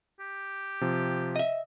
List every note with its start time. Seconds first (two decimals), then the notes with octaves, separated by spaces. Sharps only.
0.20 G4
0.81 C3 F3
1.36 D#5 E5